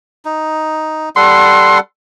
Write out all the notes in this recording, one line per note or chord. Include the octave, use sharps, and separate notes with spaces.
D#4
G3 A4 F#5 C6